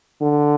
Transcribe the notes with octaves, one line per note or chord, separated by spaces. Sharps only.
D3